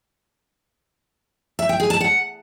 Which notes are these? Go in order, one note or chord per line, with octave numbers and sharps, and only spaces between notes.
E5
G5
G#4
A5
F#5